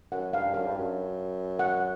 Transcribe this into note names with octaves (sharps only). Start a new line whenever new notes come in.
F#2 F#5
G2 F5
F#2 F5
G2
F#2
F#5